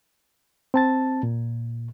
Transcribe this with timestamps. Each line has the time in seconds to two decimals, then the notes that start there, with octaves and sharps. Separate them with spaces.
0.74 C4 A5 A6
1.23 A#2